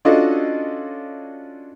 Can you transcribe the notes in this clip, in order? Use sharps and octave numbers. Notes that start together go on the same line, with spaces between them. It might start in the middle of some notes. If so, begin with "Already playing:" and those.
C#4 D4 F4 F#4 A4 D#5